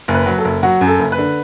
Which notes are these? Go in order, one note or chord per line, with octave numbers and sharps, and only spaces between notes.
F#1
B4
F#3
A4
F#1
F#3 F#4
F#2
A4
F#1
B4
D3